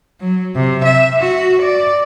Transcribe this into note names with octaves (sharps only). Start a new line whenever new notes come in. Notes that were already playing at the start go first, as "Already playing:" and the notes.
F#3
C3
E5
F#4
D5